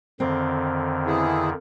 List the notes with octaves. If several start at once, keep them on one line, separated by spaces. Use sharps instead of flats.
F2 D3 D#3 C4
B3 E4 G#4